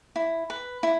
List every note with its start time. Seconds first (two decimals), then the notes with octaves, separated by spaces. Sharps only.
0.16 E4
0.50 B4
0.83 E4